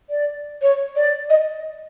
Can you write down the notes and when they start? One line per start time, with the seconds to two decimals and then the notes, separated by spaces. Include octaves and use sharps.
0.10 D5
0.62 C#5
0.96 D5
1.30 D#5